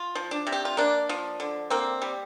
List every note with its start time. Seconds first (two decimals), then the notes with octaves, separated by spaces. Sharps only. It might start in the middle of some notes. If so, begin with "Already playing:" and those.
Already playing: F4
0.15 F3
0.31 D4
0.47 C3
0.52 G4
0.65 F4
0.77 A#3 D4
1.09 F3
1.40 D3
1.70 A#3 C4
2.02 G3